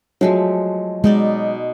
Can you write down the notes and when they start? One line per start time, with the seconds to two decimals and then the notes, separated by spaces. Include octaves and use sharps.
0.21 F3 F#3 G#3 A3
1.04 B2 G#3 D#4 D5